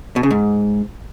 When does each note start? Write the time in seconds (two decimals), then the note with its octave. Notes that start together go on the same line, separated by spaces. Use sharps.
0.16 B2
0.23 C#3
0.31 G#2